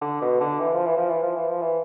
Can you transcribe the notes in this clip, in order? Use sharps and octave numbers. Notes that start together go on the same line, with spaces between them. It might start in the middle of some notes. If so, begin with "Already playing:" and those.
D3
B2
D3
E3
F3
E3
F3
E3
F3
E3
F3
E3